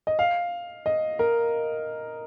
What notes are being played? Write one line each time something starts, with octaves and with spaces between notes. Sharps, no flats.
D#5
F5
D#5
A#4